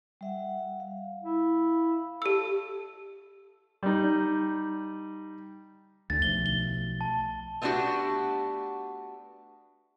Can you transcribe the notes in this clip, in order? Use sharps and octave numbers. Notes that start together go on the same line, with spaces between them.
G3 E5 F#5
F5
E4
G4 A4 E6
G3 D#4
D2 D3 A6
B1 F3 A3 G7
G7
A5
A3 B3 C4 D4 F#4 G4